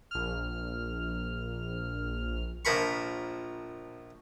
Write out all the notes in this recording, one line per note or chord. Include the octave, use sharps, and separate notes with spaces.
A#1 F6
A#1 F3 A#4 B5 C#6